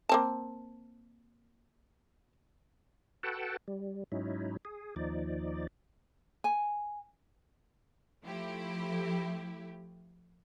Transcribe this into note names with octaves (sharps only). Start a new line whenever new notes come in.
A#3 C4 A5
F#4 A4 B4 F#5 G5 A5
G3
G#2 F#3 C#4 D#4 E4
G#4
D#2 F3 D#4 D5
G#5
F3 A3 E4 G4